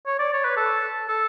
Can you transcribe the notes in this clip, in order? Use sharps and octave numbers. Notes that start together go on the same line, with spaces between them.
C#5
D5
C#5
B4
A4
A4